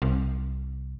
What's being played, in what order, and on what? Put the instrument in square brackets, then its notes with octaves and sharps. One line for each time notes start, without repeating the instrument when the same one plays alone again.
[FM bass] C2